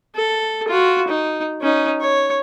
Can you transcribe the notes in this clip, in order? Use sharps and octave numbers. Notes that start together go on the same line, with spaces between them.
A4
F4 F#4
D#4
C#4 D#4
C#5